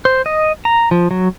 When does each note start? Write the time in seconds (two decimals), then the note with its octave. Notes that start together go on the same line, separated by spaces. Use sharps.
0.05 C5
0.26 D#5
0.65 A#5
0.91 F3
1.11 F#3